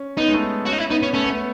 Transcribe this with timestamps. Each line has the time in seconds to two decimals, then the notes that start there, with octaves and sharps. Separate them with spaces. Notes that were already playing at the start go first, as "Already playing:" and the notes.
Already playing: C#4
0.17 B3 D#4
0.28 G#3
0.34 A3
0.66 C#4 F#4
0.73 D#4
0.78 E4
0.90 B3 D#4
1.02 C#4
1.14 A3 C#4
1.24 B3
1.30 A3